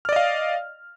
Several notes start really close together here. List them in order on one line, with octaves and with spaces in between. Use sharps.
F6 D5 D#5 F5